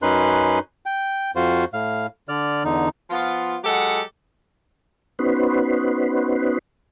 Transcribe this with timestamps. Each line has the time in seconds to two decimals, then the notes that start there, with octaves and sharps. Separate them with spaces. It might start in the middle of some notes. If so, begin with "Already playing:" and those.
0.02 F#2 C#4 D#4 B4 C6 F#6
0.86 G5
1.36 F2 F4 F#4 C5
1.73 A2 F5
2.29 D3 D5 F6
2.65 E2 D3 D#4
3.10 F3 B3 F4
3.64 F#3 G#3 G4 A4 F#5
5.19 B3 C#4 D#4 F#4 B4 C5